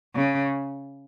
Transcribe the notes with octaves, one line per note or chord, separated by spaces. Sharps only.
C#3